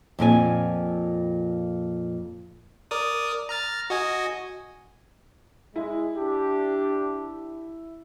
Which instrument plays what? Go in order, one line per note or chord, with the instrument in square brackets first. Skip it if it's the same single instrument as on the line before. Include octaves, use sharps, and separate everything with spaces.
[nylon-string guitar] F2 A#2 G4 G#5
[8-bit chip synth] A#4 D5 D#6
A#5 F6 A6
F#4 D#5 G#5
[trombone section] G#3 [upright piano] E4
[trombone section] D4 G4